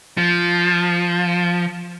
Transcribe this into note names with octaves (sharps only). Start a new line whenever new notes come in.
F3